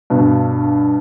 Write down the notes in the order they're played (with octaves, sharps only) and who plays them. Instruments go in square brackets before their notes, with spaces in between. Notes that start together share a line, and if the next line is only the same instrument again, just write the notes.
[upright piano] G2 B2